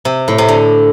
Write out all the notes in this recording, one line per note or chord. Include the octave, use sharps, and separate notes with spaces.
C3
A2
C3
D3